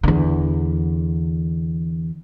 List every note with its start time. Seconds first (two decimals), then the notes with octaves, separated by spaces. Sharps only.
0.03 E2 D3